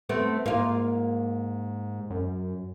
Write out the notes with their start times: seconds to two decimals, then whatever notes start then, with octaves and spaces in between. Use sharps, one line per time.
0.09 A3 B3 C4
0.46 G#2 A#3 F4
2.10 F#2